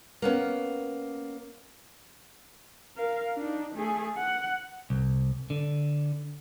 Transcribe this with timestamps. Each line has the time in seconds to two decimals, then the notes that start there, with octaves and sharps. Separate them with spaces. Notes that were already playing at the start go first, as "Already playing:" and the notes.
0.22 A#3 B3 C#4
2.96 A#4 F5
3.37 D4 D#4
3.75 A3 G#4
4.17 F#5
4.90 C2
5.50 D3